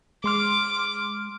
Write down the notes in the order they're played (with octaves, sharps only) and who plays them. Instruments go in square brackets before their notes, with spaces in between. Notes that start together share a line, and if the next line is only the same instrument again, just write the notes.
[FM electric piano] G#3 C6 F6 [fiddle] D6